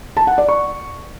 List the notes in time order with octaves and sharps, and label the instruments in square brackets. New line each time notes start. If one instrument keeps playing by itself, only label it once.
[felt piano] A5
F#5
D5
C#6